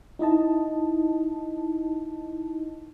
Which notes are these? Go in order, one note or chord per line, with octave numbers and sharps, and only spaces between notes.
D#4 E4 D#5 A5